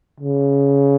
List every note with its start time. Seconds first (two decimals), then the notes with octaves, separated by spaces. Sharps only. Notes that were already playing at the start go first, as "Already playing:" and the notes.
0.20 C#3